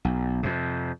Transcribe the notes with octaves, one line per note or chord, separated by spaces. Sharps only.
B1
F2 C3